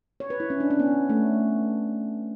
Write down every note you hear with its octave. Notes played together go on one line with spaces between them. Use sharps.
C#5
B4
E4
C#4
D4
C#4
B3
A3